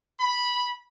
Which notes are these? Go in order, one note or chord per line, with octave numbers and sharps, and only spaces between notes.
B5